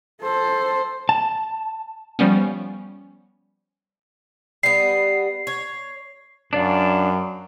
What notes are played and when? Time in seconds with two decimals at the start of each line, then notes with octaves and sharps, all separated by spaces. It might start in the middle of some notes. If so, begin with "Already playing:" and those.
0.21 A4 C5
1.09 A5
2.19 F3 G3 B3 C#4
4.63 G3 B3 C7
5.47 C#5
6.53 F#2 D4 D5 F5